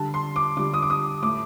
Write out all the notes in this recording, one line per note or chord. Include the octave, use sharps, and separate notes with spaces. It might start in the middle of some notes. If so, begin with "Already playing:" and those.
Already playing: D3 G3 A5
C6
D6
D3 G3 D6
D#6
D6
D#6
A2 A3 D6